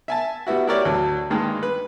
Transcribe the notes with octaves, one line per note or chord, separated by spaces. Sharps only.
E5 G#5 A5
G3 B3 E4 F#4
E4 F#4 G4 A#4 C#5 D5
D2 F#3
G2 D#3 G#3 A#3
B4